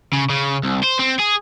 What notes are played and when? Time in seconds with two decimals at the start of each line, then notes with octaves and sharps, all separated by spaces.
0.13 C#3
0.30 C#3
0.64 C2
0.84 C5
1.00 C4
1.20 G#4